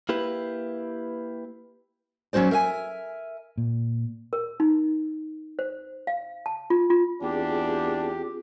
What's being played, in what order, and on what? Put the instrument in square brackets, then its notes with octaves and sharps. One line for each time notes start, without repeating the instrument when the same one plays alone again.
[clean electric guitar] A#3 E4 G4 B4
[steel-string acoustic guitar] F#3 C#4 F#4 C5 D5
A#4 E5 F5 G#5
[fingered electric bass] A#2
[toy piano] A#4
D#4
C5
F5
A5
F4
F4
[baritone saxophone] E2 [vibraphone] C4 F4 G#4 [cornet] D4 [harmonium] G4